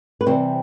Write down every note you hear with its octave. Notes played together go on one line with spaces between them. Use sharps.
B4
C3 E3 G3 C5